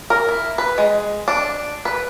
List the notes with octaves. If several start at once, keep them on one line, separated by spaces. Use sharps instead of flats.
A#4
E4
B4
G#3
D4
B4